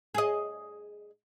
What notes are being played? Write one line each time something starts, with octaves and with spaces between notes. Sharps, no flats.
G#4 D#5